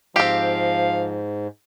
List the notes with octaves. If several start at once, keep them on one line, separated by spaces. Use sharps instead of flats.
G#2 F3 C4 G4 F5